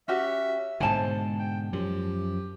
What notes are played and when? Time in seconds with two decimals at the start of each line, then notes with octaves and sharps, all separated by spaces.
0.08 C#4 F#4 G4 E5
0.80 G#2 B2 D3 C5 G#5 A5
1.39 G5
1.73 F#2 F3 G4